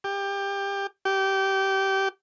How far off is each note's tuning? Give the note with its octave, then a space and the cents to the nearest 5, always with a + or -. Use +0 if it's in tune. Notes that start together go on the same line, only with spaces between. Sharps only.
G4 +20
G4 -20